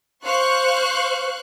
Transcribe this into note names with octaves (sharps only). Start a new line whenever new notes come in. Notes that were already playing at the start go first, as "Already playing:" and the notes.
C5 F5 C#6 F#6